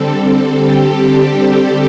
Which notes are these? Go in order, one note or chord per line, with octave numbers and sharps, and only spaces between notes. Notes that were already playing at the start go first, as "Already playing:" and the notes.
Already playing: D3 G3 C4 A4
G4